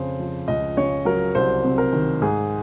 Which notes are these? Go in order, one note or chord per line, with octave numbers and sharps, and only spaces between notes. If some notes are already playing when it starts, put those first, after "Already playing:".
Already playing: F2 C#3 C5
F3
C#2 D#5
C#3 C#5
F#3 A#4
C2 C5
C3
A#4
D#3
G#2 G#4